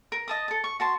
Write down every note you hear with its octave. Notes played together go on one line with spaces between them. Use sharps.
A#4
D#5 A5 D#6
A4 A5
C#6
F#4 A5 C6